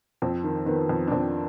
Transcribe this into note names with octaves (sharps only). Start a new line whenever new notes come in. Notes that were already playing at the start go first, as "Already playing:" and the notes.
F2 C4
D#3
D#3 B3
F2
D4
F2 C4